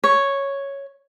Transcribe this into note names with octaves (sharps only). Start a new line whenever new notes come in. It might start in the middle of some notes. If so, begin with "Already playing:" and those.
C#5